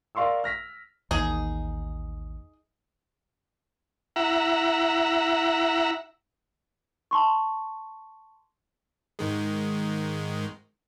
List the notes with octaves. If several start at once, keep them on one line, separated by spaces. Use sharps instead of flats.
A#4 D5 F5 C6 C#6 E6
F6 A#6 B6
A1 D#2 D#4 G#4
E4 E5 F#5 A#5
A5 C6 C#6
G#2 D#3 G#3